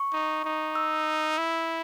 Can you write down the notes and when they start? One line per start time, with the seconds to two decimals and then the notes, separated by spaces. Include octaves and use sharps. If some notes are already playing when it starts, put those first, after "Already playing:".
Already playing: C#6
0.13 D#4
0.44 D#4
0.75 E6
1.38 E4